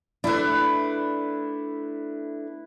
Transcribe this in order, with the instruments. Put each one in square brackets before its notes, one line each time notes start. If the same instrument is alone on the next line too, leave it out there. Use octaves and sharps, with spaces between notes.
[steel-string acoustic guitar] A3 D4 [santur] E4 B4